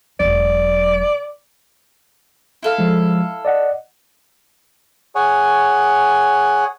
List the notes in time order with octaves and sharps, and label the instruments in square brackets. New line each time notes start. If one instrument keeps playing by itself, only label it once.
[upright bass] E1 F#3 [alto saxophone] D5
[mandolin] E4 A4 F5
[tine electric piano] F3 G#3
D5 D#5 F#5
[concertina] G#4 C#5 F#5 G#5